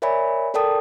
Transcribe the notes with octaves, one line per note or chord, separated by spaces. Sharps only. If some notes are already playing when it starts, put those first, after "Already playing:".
A#4 C#5 D5 E5 G#5 B5
A4 A#4 D5 G5 A5 D#6